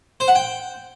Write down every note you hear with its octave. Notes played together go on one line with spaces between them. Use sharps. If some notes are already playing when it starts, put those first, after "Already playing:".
C5
F#5
G5